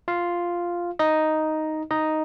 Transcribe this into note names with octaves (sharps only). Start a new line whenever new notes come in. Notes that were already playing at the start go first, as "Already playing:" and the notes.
F4 F5
D#4 D#5
D#4 D#5